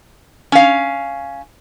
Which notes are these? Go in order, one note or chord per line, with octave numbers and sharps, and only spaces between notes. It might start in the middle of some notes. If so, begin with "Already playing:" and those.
C#4 F5